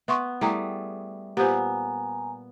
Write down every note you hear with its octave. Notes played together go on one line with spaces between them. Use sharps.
B3 E5 C6 C#6
G3 A3 E4 G#4 G5 A#5
A#2 B3 G4 C5 G#5 A#5